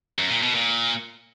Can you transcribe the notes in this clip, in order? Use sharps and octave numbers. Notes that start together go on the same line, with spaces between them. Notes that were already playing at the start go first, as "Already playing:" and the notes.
F#2
A#2
B2
A#2